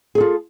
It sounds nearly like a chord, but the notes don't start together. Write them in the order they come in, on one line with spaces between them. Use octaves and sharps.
G#4 A4 F4